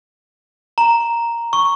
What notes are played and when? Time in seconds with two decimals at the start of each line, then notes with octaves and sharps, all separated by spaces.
0.78 A#5
1.53 C#6